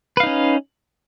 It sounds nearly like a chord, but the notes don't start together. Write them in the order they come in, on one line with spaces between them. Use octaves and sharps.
B4 F5 D#4 C#4